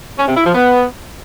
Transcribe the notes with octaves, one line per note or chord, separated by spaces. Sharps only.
C#4
C3
E4
F3
B3